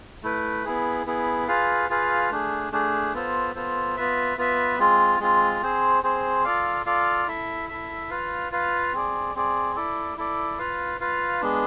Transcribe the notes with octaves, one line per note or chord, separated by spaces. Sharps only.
A3 E4 B4
B3 E4 G#4
B3 E4 G#4
F4 G#4 B4 F5
F4 G#4 B4 F5
A3 D4 G#4
A3 D4 G#4
B3 F4 A4 C5
B3 F4 A4 C5
B3 F4 B4 E5
B3 F4 B4 E5
G#3 C4 F4
G#3 C4 F4
C4 G#4 C5
C4 G#4 C5
F4 A4 D5 F5
F4 A4 D5 F5
E4 A4 E5
E4 A4 E5
F4 B4 F5
F4 B4 F5
C4 G#4 D5
C4 G#4 D5
E4 A4 D5
E4 A4 D5
F4 B4 F5
F4 B4 F5
G#3 B3 D4